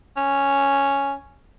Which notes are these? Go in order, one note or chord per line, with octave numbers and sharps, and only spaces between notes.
C#4